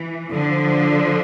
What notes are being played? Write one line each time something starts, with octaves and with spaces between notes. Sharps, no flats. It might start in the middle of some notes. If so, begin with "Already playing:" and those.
Already playing: E3
D3 F3